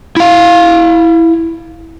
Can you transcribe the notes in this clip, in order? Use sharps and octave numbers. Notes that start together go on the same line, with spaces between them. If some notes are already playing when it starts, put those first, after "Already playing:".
E4 F5